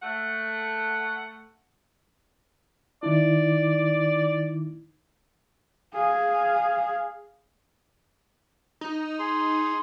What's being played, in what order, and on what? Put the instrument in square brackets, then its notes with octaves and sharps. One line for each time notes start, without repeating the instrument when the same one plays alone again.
[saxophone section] A3 F#5
[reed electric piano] D#3 D#4 E4 [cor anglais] D5
[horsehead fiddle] G#4 F5
[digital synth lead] D#4
[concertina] G#4 C6